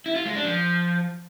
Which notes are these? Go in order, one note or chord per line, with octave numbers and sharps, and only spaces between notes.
E4
F4
G#3
D4
F3